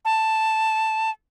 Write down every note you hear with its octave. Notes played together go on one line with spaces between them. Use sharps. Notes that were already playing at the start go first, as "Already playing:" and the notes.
A5